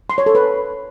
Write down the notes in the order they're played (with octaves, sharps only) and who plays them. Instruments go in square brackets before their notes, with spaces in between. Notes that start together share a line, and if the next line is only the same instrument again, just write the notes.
[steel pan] C6
C#5
A4
B4